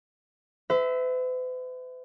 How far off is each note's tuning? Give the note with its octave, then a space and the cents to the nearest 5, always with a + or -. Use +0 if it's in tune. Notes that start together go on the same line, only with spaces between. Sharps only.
B4 +45 E5 -10